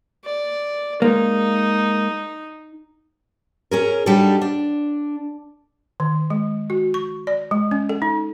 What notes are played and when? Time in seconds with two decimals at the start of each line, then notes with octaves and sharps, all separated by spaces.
0.24 D5
1.02 G#3 A#3 D#4
3.71 C#4 G#4 A#4
4.06 G3 D4 D#4 F#4 G4 A4
4.41 D4
6.00 D#3
6.30 G#3
6.70 F#4
6.94 C#6
7.27 D5
7.51 G#3
7.71 C#4
7.89 A4
8.02 D#4